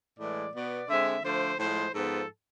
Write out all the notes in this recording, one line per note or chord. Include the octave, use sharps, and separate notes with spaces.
A2 E3 G#3 D5
B2 B3 D5
D3 G#3 C4 E5
D3 F3 A3 C5
A2 F3 G#3 C5
G#2 F3 B3 A4